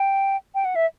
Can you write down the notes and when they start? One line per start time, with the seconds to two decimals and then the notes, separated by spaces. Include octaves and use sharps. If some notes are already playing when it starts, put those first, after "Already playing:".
Already playing: G5
0.55 G5
0.65 F#5
0.76 E5